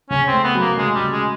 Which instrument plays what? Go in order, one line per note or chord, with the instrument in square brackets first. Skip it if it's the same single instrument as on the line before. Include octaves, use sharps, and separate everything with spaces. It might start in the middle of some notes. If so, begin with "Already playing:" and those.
[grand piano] C#3 [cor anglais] C#4
[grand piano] A3 [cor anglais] C4
[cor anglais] B3
[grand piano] F#3
[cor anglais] A#3
[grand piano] C#3 [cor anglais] G#3
[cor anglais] G3
[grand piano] C#3
[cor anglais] G#3